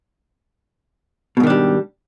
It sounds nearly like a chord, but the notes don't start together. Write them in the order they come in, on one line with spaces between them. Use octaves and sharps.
B2 G#2 D#3 D4 G3